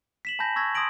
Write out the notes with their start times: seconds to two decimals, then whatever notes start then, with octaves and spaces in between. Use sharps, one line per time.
0.25 B6 E7 F#7
0.39 G#5 A5 B5 G6 A#6
0.56 C#6 E6 G#6 A#6
0.75 C6 D#6 G#6 A#6 D7 F#7